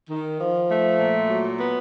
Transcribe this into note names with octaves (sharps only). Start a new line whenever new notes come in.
D#3
F3
A3
A#2
F#3
B3